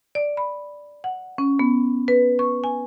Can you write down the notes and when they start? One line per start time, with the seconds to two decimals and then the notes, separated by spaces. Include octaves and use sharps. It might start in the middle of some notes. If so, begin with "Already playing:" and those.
0.15 D5
0.37 B5
1.04 F#5
1.38 C#4
1.59 B3
2.08 B4
2.39 C#6
2.64 G#5